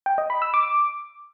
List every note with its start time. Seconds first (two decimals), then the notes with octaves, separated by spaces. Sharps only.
0.06 G5
0.18 D#5
0.30 B5
0.42 E6
0.54 D6